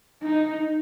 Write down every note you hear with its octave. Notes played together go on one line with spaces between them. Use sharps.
D#4